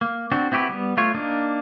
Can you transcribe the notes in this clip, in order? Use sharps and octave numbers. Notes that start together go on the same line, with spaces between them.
A#3
C4 D4 F#4
C4 E4 F#4 G4 B4
G3 B3
A3 F4 C#5
A#3 D4 D#4